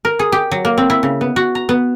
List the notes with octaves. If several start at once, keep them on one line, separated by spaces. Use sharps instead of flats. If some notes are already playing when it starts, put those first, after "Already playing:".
A#4
G#4
G4
F#3
A#3
C4
E4
C#3
B3
F#4
A#5
B3